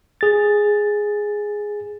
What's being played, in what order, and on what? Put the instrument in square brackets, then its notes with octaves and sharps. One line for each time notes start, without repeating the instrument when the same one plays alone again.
[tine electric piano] G#4 A6